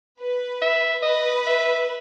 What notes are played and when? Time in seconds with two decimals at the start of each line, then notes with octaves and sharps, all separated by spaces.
0.20 B4
0.62 E5
1.02 B4 D#5
1.47 E5